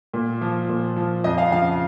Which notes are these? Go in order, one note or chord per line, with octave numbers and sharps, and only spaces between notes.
A#2
F3
A#2
F3
F2 D#5
F5
C#3 F3 F5